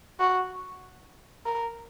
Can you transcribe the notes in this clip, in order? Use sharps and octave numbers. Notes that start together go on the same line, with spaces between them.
F#4
A#4